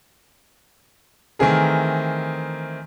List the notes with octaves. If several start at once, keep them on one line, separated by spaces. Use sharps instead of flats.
D#3 E3 A3 C4 G#4 A#4